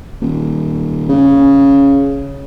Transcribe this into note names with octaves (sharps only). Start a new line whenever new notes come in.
D#1
C#3